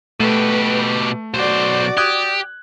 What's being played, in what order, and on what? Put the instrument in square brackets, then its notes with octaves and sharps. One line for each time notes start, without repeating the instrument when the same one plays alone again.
[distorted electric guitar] B2 G4 [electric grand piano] A3 [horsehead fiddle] B4
[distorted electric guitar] B1 C5 [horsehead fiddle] F#4 D5
[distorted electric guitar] G4 [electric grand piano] D#6 F#6 G#6